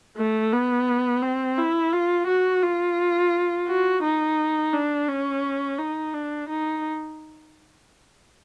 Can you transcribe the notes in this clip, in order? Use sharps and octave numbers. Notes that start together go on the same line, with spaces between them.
A3
B3
C4
E4
F4
F#4
F4
F#4
D#4
D4
C#4
D#4
D4
D#4